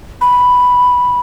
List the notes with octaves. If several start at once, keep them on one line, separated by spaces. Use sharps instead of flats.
B5